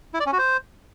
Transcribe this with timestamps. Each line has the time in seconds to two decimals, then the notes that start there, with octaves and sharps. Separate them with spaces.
0.14 E4
0.20 D5
0.26 C#4
0.32 F#4
0.39 C5